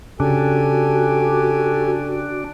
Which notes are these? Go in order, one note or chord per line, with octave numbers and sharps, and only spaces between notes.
C#3 D4 F#4 G4 A4 G#5